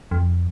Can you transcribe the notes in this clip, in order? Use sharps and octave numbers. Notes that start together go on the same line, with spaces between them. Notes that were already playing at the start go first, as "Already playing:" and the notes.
F2